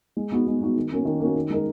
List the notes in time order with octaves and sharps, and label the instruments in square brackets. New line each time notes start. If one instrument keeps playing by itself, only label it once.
[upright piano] G#3
B3 D#4 F#4
G#3
B3 D#4 F#4
D#3
A#3 C#4 F#4
D#3
A#3 C#4 F#4
D#3
G#3 D#4 A#4